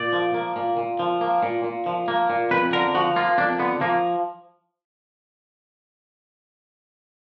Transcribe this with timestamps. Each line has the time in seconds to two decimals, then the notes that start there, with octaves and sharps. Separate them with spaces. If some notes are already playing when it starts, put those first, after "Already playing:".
Already playing: A#2 D5
0.13 F3
0.35 A#3
0.56 A#2
0.78 A#2
0.99 F3
1.21 A#3
1.43 A#2
1.64 A#2
1.86 F3
2.08 A#3
2.30 A#2
2.51 F2 B4
2.73 D3 A#4
2.95 F3 F#4
3.16 A#3 F4
3.38 F2 D4
3.59 D3 B3
3.81 F3 A#3